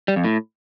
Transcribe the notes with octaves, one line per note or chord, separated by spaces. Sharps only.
G3
F2
A2